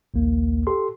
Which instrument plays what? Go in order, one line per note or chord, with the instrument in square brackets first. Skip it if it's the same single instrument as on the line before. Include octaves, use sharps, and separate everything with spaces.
[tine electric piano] A#1 D#2 A#3
G4 A4 C6